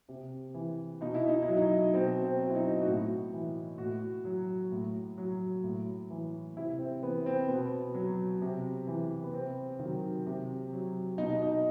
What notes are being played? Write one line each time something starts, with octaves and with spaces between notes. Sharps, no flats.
C3
E3
B2 D#4
E4
D#4
E4
F#3
D#4
B2 C4
C4
F#3
E4
D#4
F#4
A2 E4
E3
A2 F#4
F#3
A2
F#3
A2
E3
C3 E4
C4
E3 B3
C4
B2 B3
F#3
C3
E3
B3
C3 C4
D#3 F#3
C3
F#3
B2 D#4
D#4